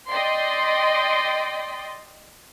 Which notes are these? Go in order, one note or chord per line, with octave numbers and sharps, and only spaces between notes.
D5 D#5 G5 C6